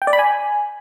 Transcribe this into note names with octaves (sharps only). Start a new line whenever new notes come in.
G5
D5
B5
G#5